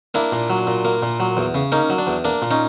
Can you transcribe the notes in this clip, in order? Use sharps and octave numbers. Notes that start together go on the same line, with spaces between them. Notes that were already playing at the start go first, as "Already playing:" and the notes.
A#3 D4 E4
A#2
F#3
A#2
A#3
A#2
F#3
E2
C#3
A#3 C#4 D#4
F#3
D4
E2
A#3 D4
A#2
C#4 D#4